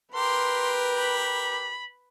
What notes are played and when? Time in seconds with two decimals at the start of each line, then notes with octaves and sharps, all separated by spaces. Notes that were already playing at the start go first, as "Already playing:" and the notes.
0.15 G4 A#4 B4 G5 C6
0.96 B5